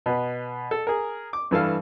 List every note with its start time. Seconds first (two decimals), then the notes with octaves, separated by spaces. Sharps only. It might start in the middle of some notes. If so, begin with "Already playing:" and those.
0.06 B2 B4
0.71 A4
0.87 G#4 A#4
1.33 D6
1.51 G2 E3 A4 F5